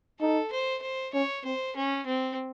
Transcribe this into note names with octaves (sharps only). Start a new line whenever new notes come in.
D#4 A4
C5
C5
C#4 C#5
C4 C5
C#4
C4